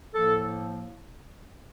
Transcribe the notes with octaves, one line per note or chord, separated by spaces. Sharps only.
A2 F3 A#3 A4